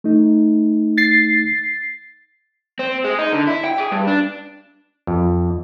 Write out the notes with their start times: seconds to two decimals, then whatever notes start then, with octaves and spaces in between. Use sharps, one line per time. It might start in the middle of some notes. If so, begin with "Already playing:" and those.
0.04 A3 D#4
0.98 A6 C7
2.79 C4
3.05 G#3
3.19 D#4
3.33 D3
3.47 E4
3.65 G5
3.78 G#4
3.92 G2
4.07 D4
5.07 F2